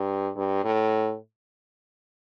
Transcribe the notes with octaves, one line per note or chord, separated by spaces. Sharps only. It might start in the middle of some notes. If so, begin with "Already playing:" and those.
Already playing: G2
G2
A2